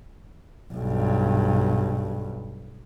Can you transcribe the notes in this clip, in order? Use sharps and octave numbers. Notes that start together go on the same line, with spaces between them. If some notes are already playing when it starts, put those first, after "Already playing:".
B1 G2